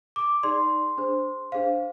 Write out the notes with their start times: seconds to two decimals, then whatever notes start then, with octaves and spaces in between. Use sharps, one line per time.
0.16 D6
0.43 D#4 G#4 D5 C6
0.98 D4 G#4 C5
1.52 D4 G#4 C5 F5